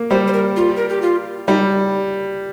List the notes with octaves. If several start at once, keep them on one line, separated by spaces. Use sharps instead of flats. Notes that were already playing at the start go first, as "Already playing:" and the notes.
Already playing: A#3
G3 C5
C5
A#4
F4
A#4
G4
F4
G3 D#4